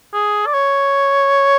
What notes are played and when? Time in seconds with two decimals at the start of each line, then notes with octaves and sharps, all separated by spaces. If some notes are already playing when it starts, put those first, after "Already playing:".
0.14 G#4
0.47 D5
0.54 C#5